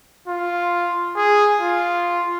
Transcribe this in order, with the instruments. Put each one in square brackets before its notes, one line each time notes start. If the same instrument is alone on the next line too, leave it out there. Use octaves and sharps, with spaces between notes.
[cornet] F4
G#4
F4